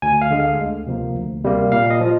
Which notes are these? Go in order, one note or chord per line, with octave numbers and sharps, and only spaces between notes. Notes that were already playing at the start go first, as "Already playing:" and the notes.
D2 G#5
F5
D3 G#3
F5
D2
C3 F3 A#3
D2
C3 G3 A#3
A#2 F5
D#5
F3